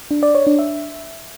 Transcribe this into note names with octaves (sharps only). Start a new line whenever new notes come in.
D4
D5
C#5
D4
E5